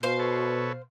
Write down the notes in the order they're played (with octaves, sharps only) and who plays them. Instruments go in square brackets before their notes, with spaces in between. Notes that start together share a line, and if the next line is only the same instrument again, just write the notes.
[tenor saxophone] B2 [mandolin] C5 F5
[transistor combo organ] A4 B4 C#5